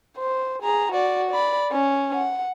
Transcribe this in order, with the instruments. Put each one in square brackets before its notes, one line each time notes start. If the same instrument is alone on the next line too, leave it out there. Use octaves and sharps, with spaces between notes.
[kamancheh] C5
G#4 A#5
F#4 D5
D5 B5
C#4
F#5